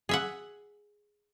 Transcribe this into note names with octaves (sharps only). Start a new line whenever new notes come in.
G#4 E5 F#5